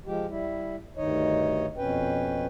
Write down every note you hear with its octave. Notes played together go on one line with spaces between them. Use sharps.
F3 G#3 G4
G3 E4
D2 G2 D#3 D#4 C#5 D#5
F2 B2 C#4 B4 G5